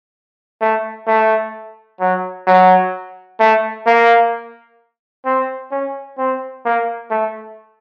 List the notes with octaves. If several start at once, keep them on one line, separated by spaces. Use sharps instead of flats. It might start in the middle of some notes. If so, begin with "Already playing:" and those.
A3
A3
F#3
F#3
A3
A#3
C4
C#4
C4
A#3
A3